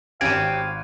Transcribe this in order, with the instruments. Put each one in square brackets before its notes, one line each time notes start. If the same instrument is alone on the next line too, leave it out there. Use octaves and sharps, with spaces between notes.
[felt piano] G#1 D7 [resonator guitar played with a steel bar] C4 C#4 G4 [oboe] F5 [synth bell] G#6 D#7